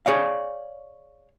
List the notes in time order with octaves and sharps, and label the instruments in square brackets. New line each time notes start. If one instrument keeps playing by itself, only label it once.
[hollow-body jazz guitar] G#4 C#5 D5 F5